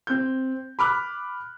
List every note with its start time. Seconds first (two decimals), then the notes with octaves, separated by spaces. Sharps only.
0.07 C4 G6
0.79 B5 D6 F6 F#6